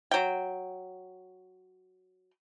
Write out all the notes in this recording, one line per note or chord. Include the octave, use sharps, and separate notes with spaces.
F#3 G5